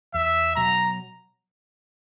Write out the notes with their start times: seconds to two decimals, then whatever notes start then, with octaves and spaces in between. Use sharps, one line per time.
0.14 E2 E5
0.56 B2 F#3 A#5